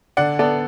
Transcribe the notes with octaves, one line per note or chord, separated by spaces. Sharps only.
D3 D5 F#5
B3 A4 D5